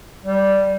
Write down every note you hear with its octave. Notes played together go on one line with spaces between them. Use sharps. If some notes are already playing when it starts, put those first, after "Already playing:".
G3